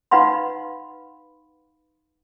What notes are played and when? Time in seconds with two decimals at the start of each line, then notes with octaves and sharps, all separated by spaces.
0.11 D#4 B4 F5 F#5 B5 C6